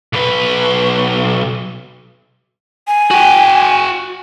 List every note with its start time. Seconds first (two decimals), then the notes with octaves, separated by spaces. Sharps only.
0.13 B1 B4
2.87 G#5
3.11 F#4 G5